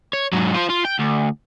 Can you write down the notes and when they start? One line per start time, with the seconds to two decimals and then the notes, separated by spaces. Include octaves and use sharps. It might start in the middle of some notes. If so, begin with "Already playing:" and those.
0.13 C#5
0.33 G#2 F#3
0.54 F4 C5
0.69 F4
0.85 G5
0.99 D2